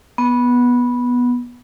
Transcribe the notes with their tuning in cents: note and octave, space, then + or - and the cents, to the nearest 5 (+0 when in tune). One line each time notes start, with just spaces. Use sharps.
B3 -10